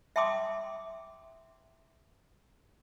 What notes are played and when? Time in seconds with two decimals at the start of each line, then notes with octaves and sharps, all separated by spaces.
0.16 E5 G5 A5 C6 D6 D#6